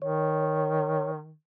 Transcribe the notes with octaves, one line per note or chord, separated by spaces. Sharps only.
D#3 C#5